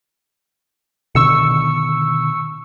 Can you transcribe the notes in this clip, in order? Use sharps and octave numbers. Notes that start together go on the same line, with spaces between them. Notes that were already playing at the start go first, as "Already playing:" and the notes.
B2 D3 D#3 C#6 E6 C#7